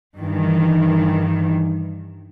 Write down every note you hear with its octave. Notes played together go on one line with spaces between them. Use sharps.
G2 D#3 E3